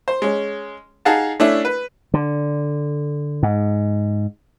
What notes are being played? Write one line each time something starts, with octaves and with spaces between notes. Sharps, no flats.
C5
G#3 C#4
D#4 G#4 F5 F#5 A5
A3 C#4 D4 E4
B4
D3
G#2